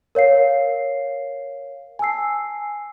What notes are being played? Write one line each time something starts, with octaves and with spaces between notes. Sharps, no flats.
A#4 C#5 F5 C7
G#5 A5 E6 C7